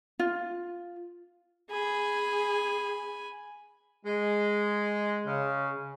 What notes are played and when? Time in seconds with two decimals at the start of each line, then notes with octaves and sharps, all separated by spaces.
0.19 F4
1.71 G#4 G#5 B5
4.05 G#3
5.26 C#3